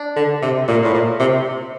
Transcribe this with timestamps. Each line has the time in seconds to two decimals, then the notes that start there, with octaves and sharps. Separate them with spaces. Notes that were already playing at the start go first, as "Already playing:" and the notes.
Already playing: D4
0.16 D3
0.42 C3
0.68 A#2
0.85 A2
0.93 A#2
1.19 C3